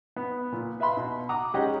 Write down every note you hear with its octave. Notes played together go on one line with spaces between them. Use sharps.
B3
A#2
B4 E5 F5 B5 C6
B2
F#5 A#5 D6 D#6
G#3 C#4 D#4 G4 D#5 F#5